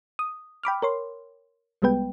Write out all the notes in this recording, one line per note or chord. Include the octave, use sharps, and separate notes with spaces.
D#6
G5 B5 D6 F6
A#4 C#5 C6
C2 G3 G#3 B3 B4 G5